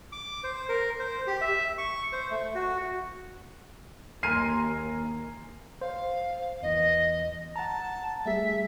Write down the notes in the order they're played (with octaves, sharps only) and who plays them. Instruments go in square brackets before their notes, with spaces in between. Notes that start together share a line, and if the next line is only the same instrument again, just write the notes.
[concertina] D6
C5
A#4
C5
G4
E5
C#6
C5
A3
F#4
[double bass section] D#2 [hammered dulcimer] A#4 G#5 C6 [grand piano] F6 C7 D#7
[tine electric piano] C5 [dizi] F5
[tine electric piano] E2 E3 [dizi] D#5
[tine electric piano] F#5 A#5 [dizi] A5
[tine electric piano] G3 A3 G#4 [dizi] E5